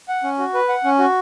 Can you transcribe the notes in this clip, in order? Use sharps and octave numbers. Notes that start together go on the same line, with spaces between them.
F#5
C#4
F#4
B4
F#5
C#4
F#4